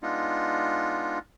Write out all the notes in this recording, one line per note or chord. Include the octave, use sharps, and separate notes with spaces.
G#3 B3 D4 D#4 F4